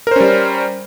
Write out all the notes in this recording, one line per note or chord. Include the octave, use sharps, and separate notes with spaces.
G3 C#4 A#4 C5